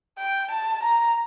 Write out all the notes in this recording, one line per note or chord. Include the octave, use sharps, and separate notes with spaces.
G5
A5
A#5